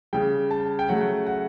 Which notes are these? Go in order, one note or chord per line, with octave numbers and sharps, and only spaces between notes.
C#3 G3 G5
A5
G5
C#3 F#3 A3 F#5
F#5